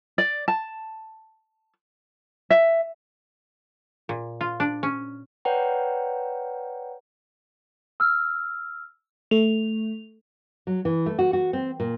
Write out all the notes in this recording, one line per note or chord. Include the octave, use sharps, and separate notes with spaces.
D5
A5
E5
A#2
F4
D4
C#4
B4 C#5 D5 F#5 G5 A#5
E6 F6
A3 F7
F#3
E3
A3
F#4
F#4
C4
A#2